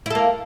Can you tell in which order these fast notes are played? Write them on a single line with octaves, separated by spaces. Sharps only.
E4 A4 A#3